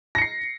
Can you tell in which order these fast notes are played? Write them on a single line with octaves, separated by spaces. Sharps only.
A#6 C#7 C7